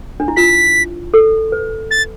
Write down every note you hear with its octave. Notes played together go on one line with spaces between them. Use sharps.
D4
E4
F4 B6
A4
B4
A6